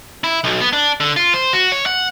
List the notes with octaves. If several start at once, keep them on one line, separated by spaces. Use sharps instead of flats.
E4
B1
B3
D4
D3
F4
C5
F#4
C#5
F#5